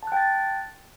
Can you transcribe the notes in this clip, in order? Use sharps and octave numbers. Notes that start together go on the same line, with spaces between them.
G5 A5 F#6 A6